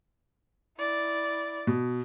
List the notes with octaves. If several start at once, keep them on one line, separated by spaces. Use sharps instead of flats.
E4 D5
B2